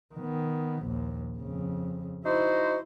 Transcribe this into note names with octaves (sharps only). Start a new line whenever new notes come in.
D#3 B3
A#1 D#2
F2 C#3
D#4 E4 F#4 C5